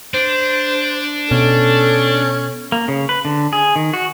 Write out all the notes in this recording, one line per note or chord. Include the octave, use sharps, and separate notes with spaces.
D4 C5
B2 C#4 A4
A#3
C#3
B4
D3
G#4
D#3
F#4